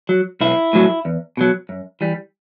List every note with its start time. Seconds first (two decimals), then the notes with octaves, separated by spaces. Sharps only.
0.09 F#3
0.41 B1 E4
0.73 A2 F#3
1.05 E2
1.37 B2 F#3
1.69 F#2
2.01 E3 G3